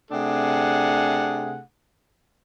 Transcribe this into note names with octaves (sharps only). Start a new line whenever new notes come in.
C3 A3 D4 G#4 F#5